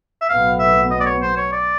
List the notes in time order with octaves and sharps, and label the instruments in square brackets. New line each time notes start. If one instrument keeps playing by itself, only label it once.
[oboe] E5
[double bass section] B1 A2 F#3 B3 [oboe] F5
[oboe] E5
D#5
D5
C#5
C5
C#5
D5